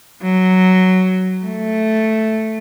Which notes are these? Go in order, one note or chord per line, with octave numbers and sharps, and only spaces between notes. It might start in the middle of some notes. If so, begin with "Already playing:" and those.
F#3
A3